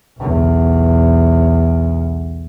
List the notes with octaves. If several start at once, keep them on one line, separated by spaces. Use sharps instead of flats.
B1 E2